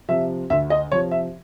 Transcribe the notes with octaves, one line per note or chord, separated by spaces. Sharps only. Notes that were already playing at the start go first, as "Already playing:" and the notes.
C3 F3 E5
D2 E5
D#5
C3 F3 C#5
E5